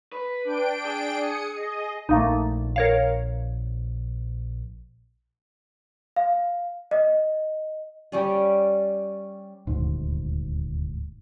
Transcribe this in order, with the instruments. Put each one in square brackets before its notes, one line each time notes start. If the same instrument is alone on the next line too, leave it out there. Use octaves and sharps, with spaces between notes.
[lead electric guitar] B4
[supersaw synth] D4 G5 D7
[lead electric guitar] G#4
[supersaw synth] D#6 C#7
D#5
[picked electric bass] A#1 [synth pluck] A3 A#3 D#4
[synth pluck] A#4 C#5 F5
[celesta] F5
D#5
[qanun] G3 C#4 D5
[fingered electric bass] D#1 G#1 D2 G#2